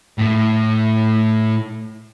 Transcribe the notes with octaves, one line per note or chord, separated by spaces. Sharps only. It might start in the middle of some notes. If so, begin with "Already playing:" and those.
A2 A3